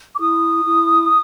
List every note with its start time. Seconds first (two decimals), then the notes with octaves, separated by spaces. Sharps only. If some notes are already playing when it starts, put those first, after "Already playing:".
0.15 D6
0.19 E4 D#6
0.65 E4